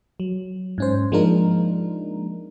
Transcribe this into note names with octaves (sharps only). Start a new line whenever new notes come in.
F#3
G#2 C#4 C5
F3 G#3 A#3 D4 D#4 A#4